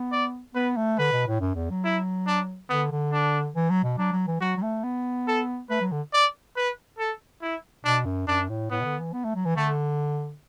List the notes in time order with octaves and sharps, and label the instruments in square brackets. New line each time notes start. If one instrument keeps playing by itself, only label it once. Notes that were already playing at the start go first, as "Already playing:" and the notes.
Already playing: [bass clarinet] B3
[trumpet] D5
[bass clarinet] B3 [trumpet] B4
[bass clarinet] A3
[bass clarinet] D3 [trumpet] B4
[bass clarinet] B2
A2
F#2
E2
F#3
[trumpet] E4
D4
[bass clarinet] D3 [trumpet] B3
[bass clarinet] D3
[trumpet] D4
[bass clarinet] E3
F#3
B2
[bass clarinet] F#3 [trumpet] D4
[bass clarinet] F#3
E3
[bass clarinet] F#3 [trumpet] F#4
[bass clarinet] F#3
A3
B3
[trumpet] A4
[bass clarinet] A3 [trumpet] B4
[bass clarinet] F#3
D3
[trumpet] D5
B4
A4
E4
[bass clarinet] B2 [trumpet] D4
[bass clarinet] F#2
[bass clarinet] F#2 [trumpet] D4
[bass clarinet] A2
[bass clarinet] A2 [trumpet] B3
[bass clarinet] B2
D3
E3
B3
A3
F#3
E3
[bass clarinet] D3 [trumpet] A3